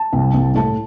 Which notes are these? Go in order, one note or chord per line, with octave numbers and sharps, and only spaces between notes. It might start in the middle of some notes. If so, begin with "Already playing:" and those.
Already playing: A5
C2
C2
A2 A5